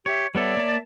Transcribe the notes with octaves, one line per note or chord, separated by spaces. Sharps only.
G4 C#5 E5
G3 B3 A4 C#5 D5 E5
A#3 A5